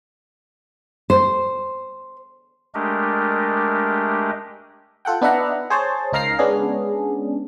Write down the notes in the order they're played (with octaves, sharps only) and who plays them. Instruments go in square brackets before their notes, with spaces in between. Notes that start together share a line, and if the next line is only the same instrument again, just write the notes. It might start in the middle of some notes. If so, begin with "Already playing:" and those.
[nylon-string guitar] C5
[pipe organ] G#3 A3 D4 G4 A#4 D#5
[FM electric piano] F4 A4 F#5 G5
B3 D4 D#4 E5 F#5 A#5
G#4 C5 C#5 A5
C#2 D#4 A#4 F5 A#5 C7
G#3 B3 C#4 D4 G#4